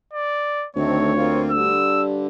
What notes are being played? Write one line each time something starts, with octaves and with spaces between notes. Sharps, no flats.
D5
D2 D#3 A3 C4 C#5
A#3 C4 F4
G2 D3 E6